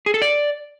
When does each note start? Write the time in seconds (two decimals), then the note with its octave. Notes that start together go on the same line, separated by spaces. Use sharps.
0.06 G#4
0.14 A4
0.22 D5